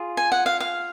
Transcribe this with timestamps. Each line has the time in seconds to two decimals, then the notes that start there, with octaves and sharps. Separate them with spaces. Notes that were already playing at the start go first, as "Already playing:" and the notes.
Already playing: F4 G#4
0.17 G#5
0.32 F#5
0.46 F5
0.60 F5